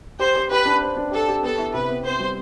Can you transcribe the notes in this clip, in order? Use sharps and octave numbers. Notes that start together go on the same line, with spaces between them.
G4 C5
G4
G4 B4
D4
C5
D4
G4 A4
G4
B3 A4
E4
C3 B4
B3
B3 C5
G3